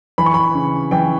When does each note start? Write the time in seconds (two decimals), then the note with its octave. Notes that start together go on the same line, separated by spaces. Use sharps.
0.18 E3 B5
0.26 C#6
0.34 B5
0.55 C#3
0.91 E3 G5